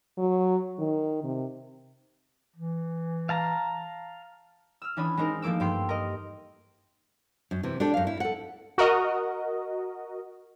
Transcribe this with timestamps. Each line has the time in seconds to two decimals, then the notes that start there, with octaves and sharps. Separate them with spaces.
0.18 F#3
0.79 D#3
1.24 C3
2.56 E3
3.29 F5 A5 A#5
4.82 E6 F6
4.97 E3 C#4 D4 B5 D#6
5.17 G#3 C4 D#4 A#4
5.42 F3 A3 A#3 D6 E6
5.60 G2 G4 C6 C7
5.89 A#4 D#5
7.51 F#2
7.63 C3 E3
7.80 D4 G4 A4 D5
7.94 F#2 F5
8.07 E4
8.20 A4 F#5
8.78 F#4 A#4 D#5